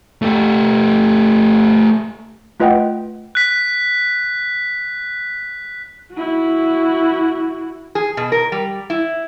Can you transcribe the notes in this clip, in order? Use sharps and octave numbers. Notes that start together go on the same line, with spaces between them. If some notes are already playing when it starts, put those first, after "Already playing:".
A3 G4
A3 F4 B4 D#5 F#5 G5
F#6 B6
E4 F#4
G#4
B2
A#4
G3
E4